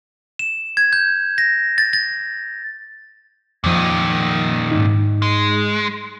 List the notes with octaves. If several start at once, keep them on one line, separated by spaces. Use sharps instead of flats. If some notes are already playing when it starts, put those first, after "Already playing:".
E7
G#6
G6
A#6
A6
A6
F2 A#2 D#3 F3 D#7
G#2 D#4
G#3